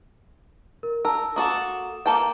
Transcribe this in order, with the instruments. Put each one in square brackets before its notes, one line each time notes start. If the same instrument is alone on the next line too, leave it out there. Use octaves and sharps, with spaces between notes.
[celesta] A#4
[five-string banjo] A#4 [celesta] A5 E6
[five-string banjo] A#3 F#4 A4 [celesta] D#6 E7
[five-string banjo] A#3 A4 G5